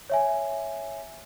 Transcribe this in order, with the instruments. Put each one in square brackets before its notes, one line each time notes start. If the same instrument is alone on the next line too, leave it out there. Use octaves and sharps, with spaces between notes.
[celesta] C#5 E5 G#5